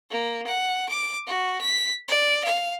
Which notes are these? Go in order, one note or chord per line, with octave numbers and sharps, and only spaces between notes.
A#3
F#5
D6
F#4
B6
D5
F5